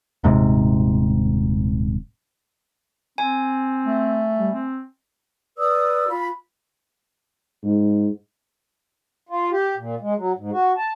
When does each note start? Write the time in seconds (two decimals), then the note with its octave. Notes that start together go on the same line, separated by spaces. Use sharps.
0.24 D#1 G#2 C3
3.18 C4 G#5
3.86 A3
4.38 G3
4.53 C4
5.57 B4 D5 D#6 E6
6.08 F4 B5
7.64 G#2
9.29 F4
9.52 G4
9.77 A#2
10.01 G#3
10.16 F#3
10.37 G#2
10.52 F#4
10.77 A5